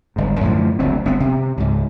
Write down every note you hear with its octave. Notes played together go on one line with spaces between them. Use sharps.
G1 G#2
F#2 A2 D3 F3
F#1 D2 G2 C4
G1 B3 C4
C3
C#2 G#2